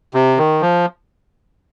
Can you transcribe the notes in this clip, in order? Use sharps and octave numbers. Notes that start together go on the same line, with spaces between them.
C3
D#3
F3